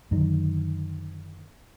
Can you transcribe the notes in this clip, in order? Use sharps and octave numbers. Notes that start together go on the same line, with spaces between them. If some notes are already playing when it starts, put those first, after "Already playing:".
F#2 D3 D#3 F#3